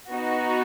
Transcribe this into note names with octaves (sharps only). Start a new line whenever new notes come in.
B3 D#4 F#4